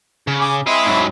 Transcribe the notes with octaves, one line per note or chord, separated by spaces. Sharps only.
C#3
G#5 D6
C4 E4 G#4 D#5 B5
G#2 F#3